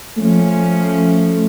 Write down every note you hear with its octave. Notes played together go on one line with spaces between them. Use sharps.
F3 A3 C#4